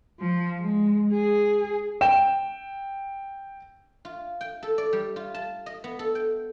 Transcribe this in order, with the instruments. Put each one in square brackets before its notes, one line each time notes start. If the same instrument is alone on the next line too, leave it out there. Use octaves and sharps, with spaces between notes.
[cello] F3
G#3
G#4
[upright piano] G5 E7
[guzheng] F4
G5
A4
D5
G3
F4
A5
D#5
B3
A4
G5